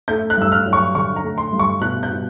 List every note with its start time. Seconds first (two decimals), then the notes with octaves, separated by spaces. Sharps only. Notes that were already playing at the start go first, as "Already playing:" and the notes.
0.08 A3 G6
0.30 F#6
0.37 G2 E6
0.52 F6
0.66 F#3
0.73 C#6
0.95 D3 C#6
1.16 A#5
1.24 A3
1.38 C6
1.53 G2
1.59 C#6
1.81 B2 F#6
2.03 G6
2.10 B2